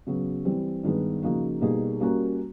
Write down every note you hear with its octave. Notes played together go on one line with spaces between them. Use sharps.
C#3 F#3 B3
E3 G3 C4
G2 D#3 G#3 B3
C#3 F3 A#3 D#4 F#4
B2 G3 A#3 D#4 G#4
G3 A#3 C#4 F#4 A#4